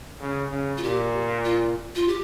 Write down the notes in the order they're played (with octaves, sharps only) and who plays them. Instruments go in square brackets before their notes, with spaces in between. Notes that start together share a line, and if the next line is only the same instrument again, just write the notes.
[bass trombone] C#3
C#3
[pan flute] F4
[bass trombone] A#2 [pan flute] G4
[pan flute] F4
F4
G4